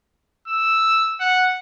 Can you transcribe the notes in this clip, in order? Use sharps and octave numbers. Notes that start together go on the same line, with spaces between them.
E6
F#5